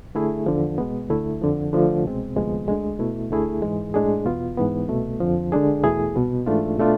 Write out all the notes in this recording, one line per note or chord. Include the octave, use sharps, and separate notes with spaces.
D3 A3 E4 G#4
E2 D3 F3
B2 G#3 B3
D2 D3 A3 E4
F2 D3 F3
D3 F3 A3 D4 F4
C2 B2 G#3 C4
D2 C3 F3 G#3 B3
D2 D3 G#3
B2 A3 E4
D2 D3 A3 E4 G#4
G#2 E3 G#3
A2 G#3 D4 G#4
E2 B2 B3 F4
G#2 E3 B3
C2 B2 A3
F2 D3 F3
D3 G#3 D4 G#4
E2 B2 A3 E4 G#4
C2 B2 B3
G#2 E3 A3 D4 F4
B2 A3 D4 F4